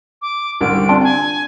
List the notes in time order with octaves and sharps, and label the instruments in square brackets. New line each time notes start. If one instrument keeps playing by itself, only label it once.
[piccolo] D6
[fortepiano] C2 D3 [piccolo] D7
[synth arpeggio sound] C4 D4 F4 [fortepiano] D5
[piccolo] G#5